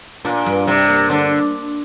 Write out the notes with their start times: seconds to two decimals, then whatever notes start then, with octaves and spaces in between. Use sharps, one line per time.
0.25 A#2 D4
0.46 G2
0.67 C3 G3
0.88 A#3
1.10 D3 D4